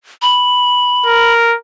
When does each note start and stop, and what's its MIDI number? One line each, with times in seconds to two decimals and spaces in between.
0.22 1.33 83
1.07 1.56 70